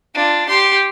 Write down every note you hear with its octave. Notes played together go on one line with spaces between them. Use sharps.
D4 F4
G4 C6